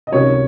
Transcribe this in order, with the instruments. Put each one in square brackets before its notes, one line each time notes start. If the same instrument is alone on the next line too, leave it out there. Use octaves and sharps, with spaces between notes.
[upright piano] D#5
C#2 C3 D#3 F#3 C#5